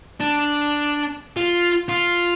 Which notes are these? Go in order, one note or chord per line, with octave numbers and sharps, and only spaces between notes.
D4
F4
F4